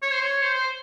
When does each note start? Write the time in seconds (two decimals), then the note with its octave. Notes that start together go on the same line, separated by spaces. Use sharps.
0.02 C#5
0.12 C5
0.22 C#5
0.42 C5
0.55 C5